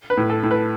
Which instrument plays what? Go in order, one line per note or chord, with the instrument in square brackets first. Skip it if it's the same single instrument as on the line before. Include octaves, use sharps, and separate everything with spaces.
[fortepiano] B4
[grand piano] A2
[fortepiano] A4
[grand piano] A2
[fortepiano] B4